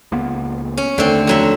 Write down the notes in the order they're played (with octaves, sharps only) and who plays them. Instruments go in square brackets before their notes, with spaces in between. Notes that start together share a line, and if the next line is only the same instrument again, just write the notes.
[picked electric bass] C#2 A#3 B3
[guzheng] C#4
[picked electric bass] D#2 A3 [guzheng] D3 C4
[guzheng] F2 F#3 E5